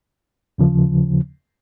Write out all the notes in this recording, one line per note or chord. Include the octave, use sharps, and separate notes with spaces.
D#2 C#3 F3